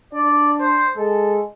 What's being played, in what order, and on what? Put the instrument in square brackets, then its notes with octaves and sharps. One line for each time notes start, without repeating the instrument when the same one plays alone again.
[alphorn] D4 [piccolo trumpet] D5
[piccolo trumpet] C5
[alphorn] G#3 [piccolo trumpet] A4